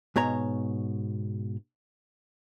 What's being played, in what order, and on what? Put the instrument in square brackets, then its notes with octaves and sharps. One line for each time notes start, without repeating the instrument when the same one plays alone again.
[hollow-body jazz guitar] G#2 B2 C#5 A#5